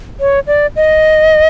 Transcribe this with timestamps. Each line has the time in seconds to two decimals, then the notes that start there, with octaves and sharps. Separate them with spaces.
0.20 C#5
0.47 D5
0.76 D#5